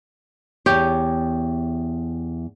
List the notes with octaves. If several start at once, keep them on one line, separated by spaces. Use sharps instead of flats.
E2 G4 C#5